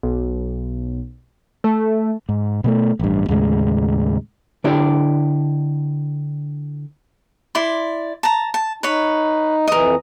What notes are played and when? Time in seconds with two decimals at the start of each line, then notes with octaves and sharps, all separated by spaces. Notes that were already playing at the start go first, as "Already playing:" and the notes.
0.03 B1
1.64 A3
2.29 G#2
2.64 B2 G#3 A3
2.99 A1 G2
3.29 D#2 A2 C#3 G#3
4.64 D3 D4 E4 G4 D5
7.55 E4 D5 C6
8.23 A5 A#5
8.54 A5
8.83 D#4 B4 C#5
9.67 F2 E3 A#4 D#5